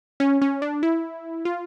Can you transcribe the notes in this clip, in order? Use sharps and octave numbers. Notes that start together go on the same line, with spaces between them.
C#4
C#4
D4
E4
F4